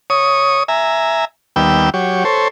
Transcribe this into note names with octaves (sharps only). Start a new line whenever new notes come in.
C#5 D#6
E5 G#5 A#5
D#2 G3 B3 G5 E6
F#3 G4 C#5
A4 C5 C#5